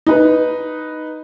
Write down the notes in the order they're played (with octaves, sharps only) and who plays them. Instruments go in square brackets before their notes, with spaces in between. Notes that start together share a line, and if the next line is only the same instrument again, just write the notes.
[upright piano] D#4 B4